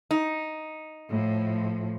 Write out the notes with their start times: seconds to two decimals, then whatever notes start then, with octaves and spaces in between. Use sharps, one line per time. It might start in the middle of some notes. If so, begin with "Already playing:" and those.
0.11 D#4
1.11 A2 F3